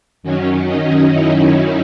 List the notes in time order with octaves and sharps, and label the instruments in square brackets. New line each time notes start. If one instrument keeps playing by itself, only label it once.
[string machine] F#2 D#3 F#3 C#4
D#4
E4
D#4